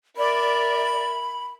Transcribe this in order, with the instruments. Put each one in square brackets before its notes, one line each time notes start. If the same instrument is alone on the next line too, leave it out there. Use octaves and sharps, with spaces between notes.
[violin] A#4 E5 [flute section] D5 [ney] B5